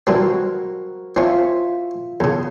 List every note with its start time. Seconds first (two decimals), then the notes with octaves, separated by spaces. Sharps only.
0.07 E3 G3 C4 F#4 A#4 C5
1.16 C4 C#4 F4 E5
2.20 E2 C#3